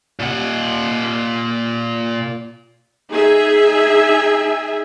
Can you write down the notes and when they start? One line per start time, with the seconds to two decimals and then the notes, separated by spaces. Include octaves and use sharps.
0.20 A#2 F#5
3.11 D#4 G#4 E5 G#5